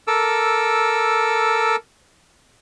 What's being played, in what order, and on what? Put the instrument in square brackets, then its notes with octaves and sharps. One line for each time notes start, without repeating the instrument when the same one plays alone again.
[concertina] A4 A#4 D6 E6